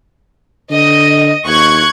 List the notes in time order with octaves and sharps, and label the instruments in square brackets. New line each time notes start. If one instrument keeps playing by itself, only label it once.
[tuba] D3 [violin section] D#5
[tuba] D#2 [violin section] C#6 F#6 G#6